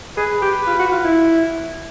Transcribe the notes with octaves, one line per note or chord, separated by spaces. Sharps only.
G#4 B4
G4
F4
F#4
F4
E4